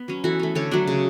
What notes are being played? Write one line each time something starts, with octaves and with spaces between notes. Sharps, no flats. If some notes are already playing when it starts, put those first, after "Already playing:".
Already playing: B3
F#3 C#4
E3 F#4 A4
A3 C#4
D3 A4 C#5
F#3 A3 D4
C#3